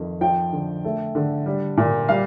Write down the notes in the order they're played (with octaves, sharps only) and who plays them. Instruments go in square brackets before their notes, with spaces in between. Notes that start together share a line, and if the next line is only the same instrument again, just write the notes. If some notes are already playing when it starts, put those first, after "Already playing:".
Already playing: [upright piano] F2 D#3
F3 G5
D3
A3
D3
G3
A#2
G3 F5